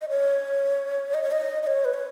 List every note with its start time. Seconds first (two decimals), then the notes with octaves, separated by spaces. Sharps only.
0.02 D#5
0.09 C#5
1.14 D#5
1.23 C#5
1.31 D#5
1.63 D#5
1.67 C#5
1.85 B4
1.94 C#5